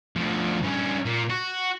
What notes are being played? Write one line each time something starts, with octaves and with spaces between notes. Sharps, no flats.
D2 F3
G2 C#4
A#2
F#4